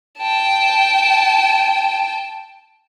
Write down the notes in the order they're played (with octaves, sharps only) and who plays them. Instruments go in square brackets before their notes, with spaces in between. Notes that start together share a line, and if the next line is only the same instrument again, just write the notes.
[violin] G5 A5